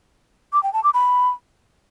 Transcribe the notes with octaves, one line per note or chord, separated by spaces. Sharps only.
D6
G5
A5
D6
B5